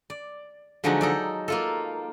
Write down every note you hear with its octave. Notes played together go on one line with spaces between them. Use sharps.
D5
D3 F3 F#3 G#3 D4 D#4
D#4 A4 D5
A#3 F4 A4